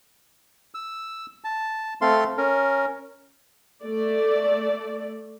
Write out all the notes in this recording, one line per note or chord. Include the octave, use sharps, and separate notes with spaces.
E6
A5
A3 C4 A4 F5 C6
C#4 A#4
A3 D5